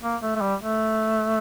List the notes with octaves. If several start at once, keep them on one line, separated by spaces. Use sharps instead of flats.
A#3
A3
A3
G3
A3